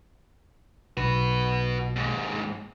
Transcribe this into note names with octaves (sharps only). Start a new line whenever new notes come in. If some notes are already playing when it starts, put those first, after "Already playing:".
B1 F#4 B4
D#2 G#2